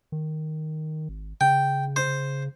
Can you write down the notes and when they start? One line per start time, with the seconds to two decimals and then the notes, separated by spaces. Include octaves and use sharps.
0.12 D#3
1.09 G#1
1.41 C#3 G5
1.96 C5